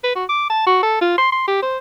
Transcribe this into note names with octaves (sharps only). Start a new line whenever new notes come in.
B4
F#4
D6
A5
F#4
A4
F4
C6
C6
G4
C5